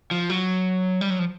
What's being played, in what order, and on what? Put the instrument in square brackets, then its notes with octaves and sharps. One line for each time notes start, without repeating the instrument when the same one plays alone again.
[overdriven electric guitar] F3
F#3
G3
F#3
F3